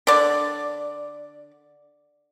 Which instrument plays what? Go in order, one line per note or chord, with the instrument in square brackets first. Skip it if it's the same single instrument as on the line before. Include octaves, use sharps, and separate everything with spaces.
[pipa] D3 D5